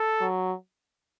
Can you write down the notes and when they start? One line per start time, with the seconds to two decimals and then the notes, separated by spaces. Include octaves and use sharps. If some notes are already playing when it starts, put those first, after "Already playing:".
Already playing: A4
0.21 F#3